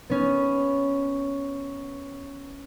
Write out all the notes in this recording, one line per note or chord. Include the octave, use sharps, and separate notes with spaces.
B3 C#4